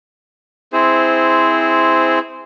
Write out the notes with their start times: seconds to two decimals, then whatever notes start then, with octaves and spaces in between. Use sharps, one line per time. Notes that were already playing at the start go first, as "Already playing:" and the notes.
0.73 C4 E4 G#4 C5